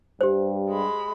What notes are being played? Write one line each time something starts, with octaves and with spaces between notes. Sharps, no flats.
G2 G4 C5
G#3 B5